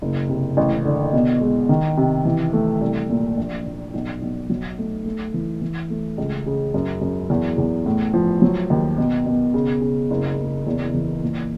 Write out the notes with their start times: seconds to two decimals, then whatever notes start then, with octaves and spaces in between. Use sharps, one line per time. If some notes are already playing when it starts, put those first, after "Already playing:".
0.02 F#1
0.29 C3
0.57 A1
0.85 D3
1.13 B2
1.41 G#3
1.69 D#3
1.97 C3
2.25 E3
2.53 A3
2.81 C2
3.10 A#2
3.37 A#1
3.66 A#1
3.94 B1
4.22 B1
4.50 F#3
4.78 A3
5.05 A3
5.34 E3
5.61 E3
5.90 A3
6.18 C#2
6.46 C#3
6.74 F#2
7.01 F#2
7.30 E2
7.58 E2
7.86 A2
8.13 F3
8.42 F#3
8.70 D#2
8.98 B2
9.26 B2
9.54 C#3
9.81 C#3
10.11 F#1
10.37 F#1
10.67 E2
10.94 E3
11.23 A#2